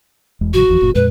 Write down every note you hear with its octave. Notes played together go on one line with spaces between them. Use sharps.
E1 E2 G#3
A1 C#3 F#3 F#4
F#1 E2 F3
F#1 A#2
F2 A#2 G#3 B4